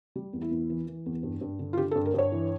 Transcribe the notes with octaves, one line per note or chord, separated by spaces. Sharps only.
G3
E2
E4
E2
E3
E3
E2
G2
G2
D3
F4
D3 G4
A4
G2
A#4
G2 C#5
E3